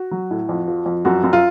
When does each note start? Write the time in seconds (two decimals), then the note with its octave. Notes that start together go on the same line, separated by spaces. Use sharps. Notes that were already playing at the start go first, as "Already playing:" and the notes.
Already playing: F#4
0.11 F#3
0.31 A2
0.49 F2
0.68 F3
0.86 F2
1.05 F#2 F#4
1.23 F#2
1.33 F4